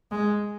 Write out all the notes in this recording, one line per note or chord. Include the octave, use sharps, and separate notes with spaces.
G#3